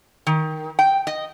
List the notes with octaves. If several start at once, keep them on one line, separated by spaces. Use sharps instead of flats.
D#3
G5
D#5